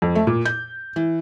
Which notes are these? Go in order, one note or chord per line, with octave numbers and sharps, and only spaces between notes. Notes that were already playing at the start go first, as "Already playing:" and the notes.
F2
A3
A#2
G6
E3